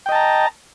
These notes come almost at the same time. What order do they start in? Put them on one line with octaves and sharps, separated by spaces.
G5 D#5 A5 A#5